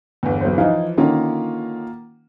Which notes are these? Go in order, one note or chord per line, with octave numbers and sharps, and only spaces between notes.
G1 E2
B1 C5
E3 F3 D#4 F5
D3 D#3 A#3 C#4 F4